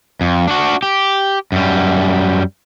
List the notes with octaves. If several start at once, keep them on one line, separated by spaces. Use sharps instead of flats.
F2
D4 F#4
G4
F#2 G3